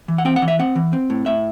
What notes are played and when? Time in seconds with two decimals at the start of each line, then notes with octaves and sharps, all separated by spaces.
0.08 E3
0.18 F#5
0.25 C4 G5
0.36 F#5
0.42 E3
0.48 E5
0.60 C4 F#5
0.76 E3
0.93 C4
1.10 A2
1.26 A2 E5